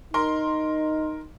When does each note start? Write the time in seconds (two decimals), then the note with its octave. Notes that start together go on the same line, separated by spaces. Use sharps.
0.14 D#4 A#4 C6